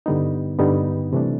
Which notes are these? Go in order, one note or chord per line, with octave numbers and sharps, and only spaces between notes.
G2 D3 G3 B3 D#4
G2 D3 G3 B3 D#4
C3 E3 A3 D4